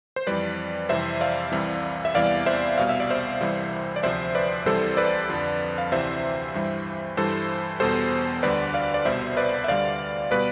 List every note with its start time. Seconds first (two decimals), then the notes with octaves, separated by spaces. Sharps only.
0.16 C5
0.27 F2 E3 G3 B4 D5
0.89 F2 C3 E3 G3 C5 E5
1.21 D5 F5
1.52 C2 C3 E3 G3
2.05 E5
2.15 E2 C3 E3 G3 D5 F5
2.46 C5 E5
2.77 C2 B2 G3 F5
2.89 E5
3.00 D5
3.10 C5 E5
3.41 C2 C3 E3 G3
3.96 D5
4.03 D2 C3 F3 C5 E5
4.35 B4 D5
4.66 C2 C3 E3 G3 A4 C5
4.97 B4 D5
5.29 F2 D3 F3
5.78 F5
5.91 D2 C3 E3 C5 E5
6.54 G2 E3 G3
7.17 G2 E3 G3 A4 C5
7.80 E2 B2 G3 A4 C5
8.43 D2 D3 G3 B4 D5
8.74 D5 F5
8.94 D5
9.05 C2 B2 G3 C5 E5
9.37 B4 D5
9.64 E5
9.68 D2 D3 G3 D5 F5
10.31 B2 G3 B4 D5